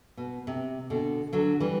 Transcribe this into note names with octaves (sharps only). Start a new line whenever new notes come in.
B2
C3
B2 D3
D3 F#3
E3 G3